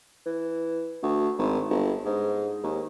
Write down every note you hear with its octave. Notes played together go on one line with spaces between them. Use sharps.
E3
D2
G#1
G1
G#2
D#2